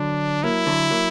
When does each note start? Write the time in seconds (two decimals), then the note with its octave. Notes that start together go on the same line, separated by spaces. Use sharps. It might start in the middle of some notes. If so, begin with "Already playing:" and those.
Already playing: D3 F#3 D4
0.43 F#3 A#3 E4
0.66 D3 F#3
0.90 F#3 A#3